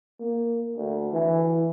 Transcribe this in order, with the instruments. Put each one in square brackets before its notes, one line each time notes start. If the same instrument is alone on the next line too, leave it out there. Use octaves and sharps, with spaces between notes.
[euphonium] A#3
D2
E3